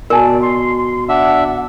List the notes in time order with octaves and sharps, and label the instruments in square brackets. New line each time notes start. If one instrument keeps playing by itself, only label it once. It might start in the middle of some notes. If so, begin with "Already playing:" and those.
[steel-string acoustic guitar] B2 [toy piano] A#4 G#5 A5 [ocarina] D5
[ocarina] C6
[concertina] D4 E5 [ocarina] F#5